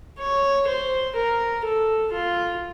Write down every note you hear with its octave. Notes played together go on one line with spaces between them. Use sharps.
C#5
C5
A#4
A4
F4